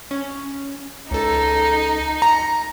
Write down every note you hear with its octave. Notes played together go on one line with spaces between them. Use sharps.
C#4
C#2 D#4 A4
A#5 C#7